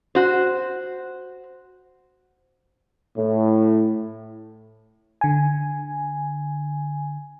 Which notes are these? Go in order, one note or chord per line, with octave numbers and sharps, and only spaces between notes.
F#4 C5
A2
D3 G#5